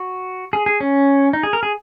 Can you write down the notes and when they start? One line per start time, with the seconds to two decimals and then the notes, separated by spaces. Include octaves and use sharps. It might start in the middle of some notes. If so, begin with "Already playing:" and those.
Already playing: F#4
0.53 G#4
0.66 G#4
0.80 C#4
1.33 D#4
1.43 G#4
1.53 A#4
1.63 G#4